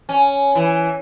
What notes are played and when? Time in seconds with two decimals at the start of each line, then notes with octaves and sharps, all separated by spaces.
0.09 C#4
0.55 E3